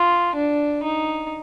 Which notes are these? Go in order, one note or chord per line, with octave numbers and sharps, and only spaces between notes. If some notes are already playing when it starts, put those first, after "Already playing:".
Already playing: F4
D4
D#4